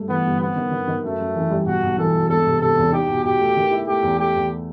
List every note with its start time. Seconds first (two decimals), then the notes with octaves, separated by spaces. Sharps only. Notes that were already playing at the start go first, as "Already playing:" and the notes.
Already playing: G2 A3
0.09 E3 B3
0.25 G1
0.40 B3 C4
0.56 D#3
0.71 D#3
0.87 D#3
1.03 F#2 A3
1.19 F#2
1.35 E3
1.50 G3
1.66 B1 F#4
1.83 B1
1.98 E3 A4
2.14 B1
2.29 E1 A4
2.46 C3
2.61 C3 A4
2.77 E2
2.92 D#4 G4
3.09 B2
3.24 B2 G4
3.40 A3
3.56 D#3
3.71 E4
3.88 A3 G4
4.03 E2
4.18 A3 G4
4.35 E2